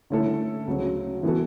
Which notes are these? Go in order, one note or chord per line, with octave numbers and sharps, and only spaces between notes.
D3 A3 C#4 E4 A4
D2 C#3 F#3
E3 B3 F#4 A4